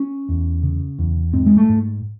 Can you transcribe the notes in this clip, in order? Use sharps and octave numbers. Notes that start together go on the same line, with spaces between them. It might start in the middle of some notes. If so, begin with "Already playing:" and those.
Already playing: C#4
E2
C#3
E2
G#2 C4
G#3
A3
G#2